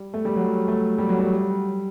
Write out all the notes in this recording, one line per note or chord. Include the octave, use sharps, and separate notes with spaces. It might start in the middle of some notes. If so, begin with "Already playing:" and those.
Already playing: G3
A3
G3
F#3
A3
G3
F#3
G3